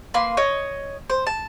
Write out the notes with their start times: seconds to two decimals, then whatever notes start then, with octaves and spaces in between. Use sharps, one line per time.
0.14 A#3 B4 C6
0.37 C#5 D#5
1.10 C5
1.27 A5